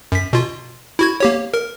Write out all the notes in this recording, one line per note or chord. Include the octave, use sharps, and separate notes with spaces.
F#2 B6
B2 F4
E4 F#4 G#6
A#3 G4 C#5
A#4